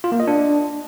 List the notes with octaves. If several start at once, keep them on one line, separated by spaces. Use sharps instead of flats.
F4
A#3
D#5
D4